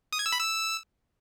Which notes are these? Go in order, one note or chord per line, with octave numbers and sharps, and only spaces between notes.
D#6
G#6
E6
B5
E6